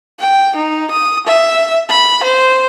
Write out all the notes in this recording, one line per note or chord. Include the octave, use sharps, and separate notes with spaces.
G5
D#4
D#6
E5
B5
C5